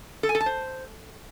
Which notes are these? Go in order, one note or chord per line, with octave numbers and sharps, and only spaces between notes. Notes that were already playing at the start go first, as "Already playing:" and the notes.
A4
G#5
A4
A5
C5